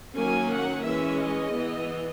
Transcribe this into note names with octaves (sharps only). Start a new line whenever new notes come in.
D#3 F#3 A#3 C#4 G#5
F#5
E3 G#3 C#4 E5
D#5
E3 B3